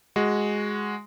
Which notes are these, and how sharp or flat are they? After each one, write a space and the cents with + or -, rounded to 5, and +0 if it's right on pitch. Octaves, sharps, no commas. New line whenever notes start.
G#3 +0 F#4 +0